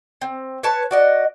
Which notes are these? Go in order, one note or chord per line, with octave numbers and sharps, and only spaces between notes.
C4
B4 C#5 A5
F#4 D5 D#5